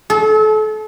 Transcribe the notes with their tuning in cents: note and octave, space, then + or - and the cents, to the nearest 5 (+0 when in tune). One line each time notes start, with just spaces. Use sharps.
A4 -35